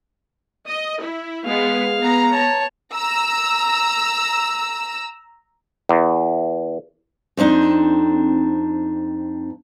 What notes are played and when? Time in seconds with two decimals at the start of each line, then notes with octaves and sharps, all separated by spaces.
0.68 D#5
1.02 E4
1.45 G#3 B3 G#4 F5
1.99 B3 A#5
2.31 C#5 A5
2.94 A#5 E6
5.89 E2
7.37 F2 C4 D4 D#4